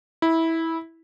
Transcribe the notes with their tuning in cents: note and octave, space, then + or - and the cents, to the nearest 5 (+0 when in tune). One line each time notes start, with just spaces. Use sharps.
E4 -15